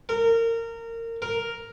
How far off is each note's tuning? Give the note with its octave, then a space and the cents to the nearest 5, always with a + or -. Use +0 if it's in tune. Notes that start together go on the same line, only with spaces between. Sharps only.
A#4 -25
A#4 +0